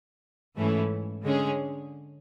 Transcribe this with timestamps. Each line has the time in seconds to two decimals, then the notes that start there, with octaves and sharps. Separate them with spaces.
0.56 G#2 E3 A3 C#4 E4
1.24 D3 G#3 C#4 G#4